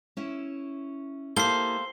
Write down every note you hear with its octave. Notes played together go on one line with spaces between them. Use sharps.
C#4 E4 E5
A#3 E4 G4 A4 C5 F5 C7 G7